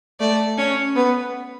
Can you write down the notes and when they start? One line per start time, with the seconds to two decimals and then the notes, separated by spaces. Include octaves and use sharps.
0.20 A3 D5
0.58 C#4 C#5
0.96 B3 B4